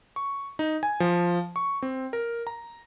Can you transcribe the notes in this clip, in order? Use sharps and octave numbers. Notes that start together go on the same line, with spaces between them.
C#6
D#4
G#5
F3
C#6
C4
A#4
A#5